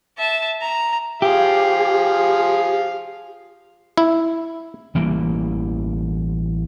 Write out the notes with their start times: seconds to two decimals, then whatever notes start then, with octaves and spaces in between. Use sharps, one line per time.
0.18 E5 A5
0.61 A#5
1.22 F3 G4 G#4 F5
3.98 E4
4.95 A1 E3 G3 A#3